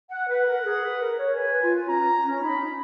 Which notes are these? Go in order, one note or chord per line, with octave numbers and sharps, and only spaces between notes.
F#5
B4 F#5
A#4
G#4
B4
A#4
C#5
B4 G#5
F4
C#4 A#5
C#4
D#4 B5